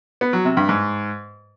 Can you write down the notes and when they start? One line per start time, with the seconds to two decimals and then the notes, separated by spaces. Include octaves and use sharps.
0.21 B3
0.33 F#3
0.45 C3
0.57 G2
0.69 G#2